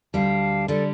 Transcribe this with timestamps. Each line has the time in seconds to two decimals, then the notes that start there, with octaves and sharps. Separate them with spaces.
0.14 D2 D3 G3 F5 A5
0.68 D3 G3 A4 D5